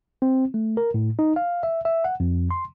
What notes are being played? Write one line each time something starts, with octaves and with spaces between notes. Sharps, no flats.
C4
A3
A#4
A2
D#4
F5
E5
E5
F#5
F2
C6